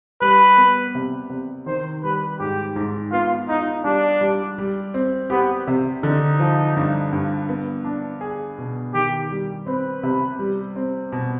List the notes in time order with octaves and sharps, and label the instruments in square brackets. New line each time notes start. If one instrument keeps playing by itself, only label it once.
[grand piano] G3 [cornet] B4
[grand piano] B3
C3
C3
[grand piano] D#3 [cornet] C5
[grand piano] G3 [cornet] B4
[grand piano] G#2 [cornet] G4
[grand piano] G#2
[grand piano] B3 [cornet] F4
[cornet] D#4 [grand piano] F4
[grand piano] G3 [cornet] D4
[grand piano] G3
G3
C4
[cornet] B3 [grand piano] G4
[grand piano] C3
[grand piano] D3 [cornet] D#4
[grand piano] F3
G2
G2
B3
D4
G#4
B2
[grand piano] D#3 [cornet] G4
[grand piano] G3
[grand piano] C4 [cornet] B4
[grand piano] C3
G3
C4
B2